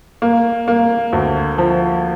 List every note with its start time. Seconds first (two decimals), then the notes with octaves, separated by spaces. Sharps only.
0.22 A#3
0.68 A#3
1.13 D2
1.58 F3